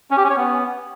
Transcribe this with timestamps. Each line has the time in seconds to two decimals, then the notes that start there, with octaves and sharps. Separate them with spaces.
0.11 C#4
0.17 G4
0.24 C#4
0.30 C#5
0.36 B3